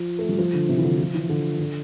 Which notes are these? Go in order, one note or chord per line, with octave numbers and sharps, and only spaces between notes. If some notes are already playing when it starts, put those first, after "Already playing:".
Already playing: F3
A3
G3
F3
D3
C3
E3
D3
F3
E3
D3
D3